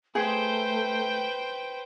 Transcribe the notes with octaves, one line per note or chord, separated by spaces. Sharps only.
A3 G#4 B4 C5 G5